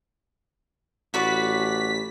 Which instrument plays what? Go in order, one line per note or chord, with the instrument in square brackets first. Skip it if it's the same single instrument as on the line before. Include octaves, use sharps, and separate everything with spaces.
[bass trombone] A1 [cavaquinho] F#4 B4 D5 [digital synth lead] B6